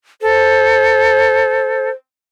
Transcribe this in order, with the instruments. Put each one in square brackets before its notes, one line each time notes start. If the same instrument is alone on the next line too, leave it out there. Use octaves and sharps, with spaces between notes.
[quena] A4 [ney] C5